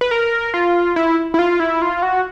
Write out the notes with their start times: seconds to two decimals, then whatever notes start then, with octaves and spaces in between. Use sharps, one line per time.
0.01 B4
0.11 A#4
0.54 F4
0.96 E4
1.34 E4
1.39 F4
1.60 E4
1.82 F4
2.03 F#4